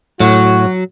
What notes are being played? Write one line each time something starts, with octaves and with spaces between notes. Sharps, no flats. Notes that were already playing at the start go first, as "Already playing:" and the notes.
A2 F#3 F#4